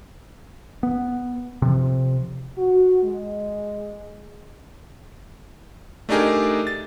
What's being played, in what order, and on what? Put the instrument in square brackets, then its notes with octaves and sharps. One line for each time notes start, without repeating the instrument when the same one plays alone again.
[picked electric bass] B3
C3 F3
[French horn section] F#4
G#3
[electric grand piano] A3 D4 D#4 G4 G#4 A#4
A6